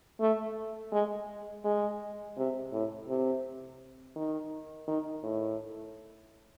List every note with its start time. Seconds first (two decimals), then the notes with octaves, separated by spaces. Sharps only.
0.20 A3
0.92 G#3
1.64 G#3
2.37 C3
2.72 A2
3.08 C3
4.16 D#3
4.87 D#3
5.23 A2